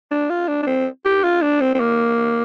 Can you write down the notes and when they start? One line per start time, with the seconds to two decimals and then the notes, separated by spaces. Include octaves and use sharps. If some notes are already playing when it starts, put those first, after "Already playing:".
0.11 D4
0.30 F4
0.48 D4
0.63 D4
0.67 C4
1.05 G4
1.24 F4
1.42 D4
1.61 C4
1.75 C4
1.80 A#3